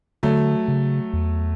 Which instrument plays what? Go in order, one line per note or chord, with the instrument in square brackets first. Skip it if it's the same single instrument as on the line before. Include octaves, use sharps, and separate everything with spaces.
[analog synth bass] D3 [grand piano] F#3 A3
[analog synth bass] C#3
E2